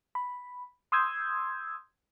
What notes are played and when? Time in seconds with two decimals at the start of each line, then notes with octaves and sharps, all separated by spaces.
0.15 B5
0.92 C6 D#6 E6 G6 G#6